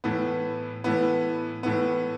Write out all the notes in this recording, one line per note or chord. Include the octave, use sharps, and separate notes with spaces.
A2 E3 B3
A2 E3 B3
A2 E3 B3